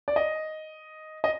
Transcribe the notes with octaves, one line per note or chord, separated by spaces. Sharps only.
D5
D#5
D#5